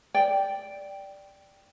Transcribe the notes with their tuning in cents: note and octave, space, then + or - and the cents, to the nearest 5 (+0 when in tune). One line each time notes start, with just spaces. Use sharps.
D5 +0 G5 +0